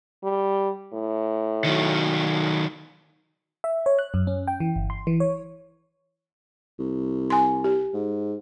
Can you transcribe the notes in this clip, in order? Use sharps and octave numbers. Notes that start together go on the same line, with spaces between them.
G3
A2
D#3 F#3
E5
C#5
F#6
F#2
C#4
G5
E3
G1
C6
E3
C#5
C2
G#5 C6
G4
G#2